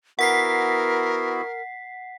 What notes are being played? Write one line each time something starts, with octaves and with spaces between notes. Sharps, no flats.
B3 E4 F#4 A#4 F#5 B6 C7